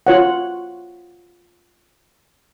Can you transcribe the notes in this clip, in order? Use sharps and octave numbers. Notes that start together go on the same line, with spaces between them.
F4 C#5 F#5